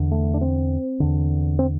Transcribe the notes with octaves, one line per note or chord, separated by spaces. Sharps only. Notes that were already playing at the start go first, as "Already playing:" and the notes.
Already playing: E2 D3
A3
D4
C4
E2 D3
C4